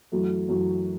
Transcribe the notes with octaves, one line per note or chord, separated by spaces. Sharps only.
F#2 E3 F#3 A3
F#2 E3 F#3